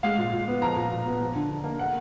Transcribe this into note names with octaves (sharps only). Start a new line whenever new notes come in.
G#3 F5
A#2
A#2
B3
F3 A#5
A#2
A#2
B3
F3
D3
D3
A#3
A#3 F#5